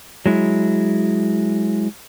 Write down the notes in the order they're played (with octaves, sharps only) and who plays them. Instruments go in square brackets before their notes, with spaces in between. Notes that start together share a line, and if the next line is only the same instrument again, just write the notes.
[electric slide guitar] F#3 G#3 E4